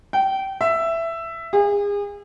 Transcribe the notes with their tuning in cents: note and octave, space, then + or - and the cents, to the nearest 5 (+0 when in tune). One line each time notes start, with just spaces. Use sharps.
G5 -25
E5 +10
G#4 -35